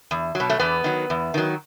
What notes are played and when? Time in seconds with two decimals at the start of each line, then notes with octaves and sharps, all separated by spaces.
0.11 E2
0.35 F#3
0.40 B2
0.50 A3
0.59 E2 B3
0.84 D#3 F#3
1.10 E2
1.34 D#3 F#3